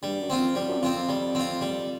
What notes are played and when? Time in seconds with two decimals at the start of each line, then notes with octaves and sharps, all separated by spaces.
0.03 G2 G3
0.21 F#2
0.30 C4 F4
0.38 F2
0.55 F2 G3
0.69 F#2
0.81 F2 C4 F4
1.09 G3
1.35 C4 F4
1.61 G3